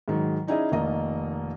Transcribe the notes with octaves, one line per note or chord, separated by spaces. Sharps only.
G#2 D#3 F#3
C#4 D#4 E4 G#4 D5 D#5
F1 D#3 A#3 D#5